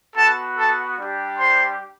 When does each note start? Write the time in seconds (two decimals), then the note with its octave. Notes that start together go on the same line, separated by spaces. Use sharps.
0.15 B3 F#4 A4 A5
0.56 A4 A5
0.98 G3 D4 G4
1.39 C5 C6